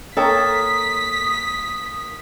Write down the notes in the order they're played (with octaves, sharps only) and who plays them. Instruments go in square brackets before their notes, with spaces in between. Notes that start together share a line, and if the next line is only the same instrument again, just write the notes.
[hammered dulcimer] A#3 [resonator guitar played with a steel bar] A4 C#5 G5 [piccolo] D#6 [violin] B6